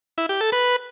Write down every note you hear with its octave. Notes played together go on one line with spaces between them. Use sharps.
E4
G4
A4
B4